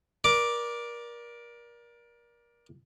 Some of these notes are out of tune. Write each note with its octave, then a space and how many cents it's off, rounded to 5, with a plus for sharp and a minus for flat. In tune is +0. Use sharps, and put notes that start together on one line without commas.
A#4 +30 D5 +0 D6 +0